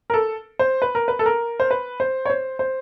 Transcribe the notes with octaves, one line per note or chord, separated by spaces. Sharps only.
A#4
A4
C5
B4
A#4
B4
A4
A#4
C5
B4
C5
C#5
C5
C5